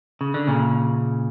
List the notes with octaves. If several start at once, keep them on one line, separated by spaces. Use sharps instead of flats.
C#3
D3
A#2 C#3